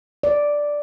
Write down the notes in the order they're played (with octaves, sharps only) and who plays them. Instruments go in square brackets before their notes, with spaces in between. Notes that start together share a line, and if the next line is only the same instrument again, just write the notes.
[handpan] D5